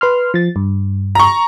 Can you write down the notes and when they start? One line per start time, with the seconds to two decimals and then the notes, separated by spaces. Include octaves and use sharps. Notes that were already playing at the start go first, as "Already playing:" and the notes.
0.01 B4 C6 F6
0.34 F3 A6
0.56 G2
1.15 A#5 C#6